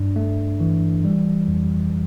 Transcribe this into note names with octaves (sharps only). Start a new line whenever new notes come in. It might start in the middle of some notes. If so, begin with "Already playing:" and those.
Already playing: G2 D4
A3
E3
G3
F2